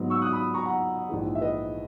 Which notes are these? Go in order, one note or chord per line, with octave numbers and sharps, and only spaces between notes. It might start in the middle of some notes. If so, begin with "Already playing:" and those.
Already playing: G#2 F#3 B3
C#6 E6
D#6 F#6
B5 D#6
A#5 C#6
F#5 A#5
A#1 G#2 E3 G#3
E5
B4 D#5